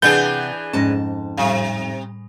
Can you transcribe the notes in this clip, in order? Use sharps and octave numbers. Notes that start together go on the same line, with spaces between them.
C3 E3 D4 G#4 B4 F#5 G6 A6
F2 G#2 C#4 A5 A#6
A2 C3 G3 F5